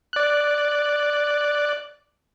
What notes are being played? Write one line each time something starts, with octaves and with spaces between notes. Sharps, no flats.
D5 F#6